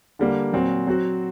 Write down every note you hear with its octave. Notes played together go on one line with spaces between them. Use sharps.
D3 G3 A#3
A#2 F#3 C4
F#3 C4 F#4